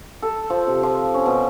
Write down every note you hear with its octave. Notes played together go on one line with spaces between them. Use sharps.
A4
F3
C3
F3
C#4
B2